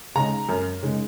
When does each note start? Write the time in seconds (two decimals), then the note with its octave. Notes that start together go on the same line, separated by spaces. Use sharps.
0.15 C#3 G#3 D#4 A#5
0.49 F#2
0.82 C#3 G#3 D#4